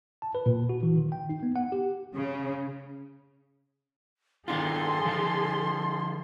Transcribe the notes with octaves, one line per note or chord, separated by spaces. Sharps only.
A5
B4
A#2
F#4
E3
D#3
G5
D#4
B3
F#5
G4
C#3
D#3 D4 F4 G#4 A4 C6
D3 F3